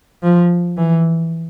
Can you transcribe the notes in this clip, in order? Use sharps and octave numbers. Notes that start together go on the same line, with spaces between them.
F3
E3